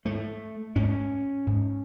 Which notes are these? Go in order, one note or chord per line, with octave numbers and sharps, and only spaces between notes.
G#2 A3
G#2 C#4
G#2